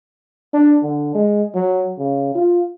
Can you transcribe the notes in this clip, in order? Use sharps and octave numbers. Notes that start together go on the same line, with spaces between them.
D4
D3
G#3
F#3
C#3
F4